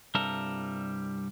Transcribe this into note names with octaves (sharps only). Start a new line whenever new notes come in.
C2 G2 G3 A4 A#4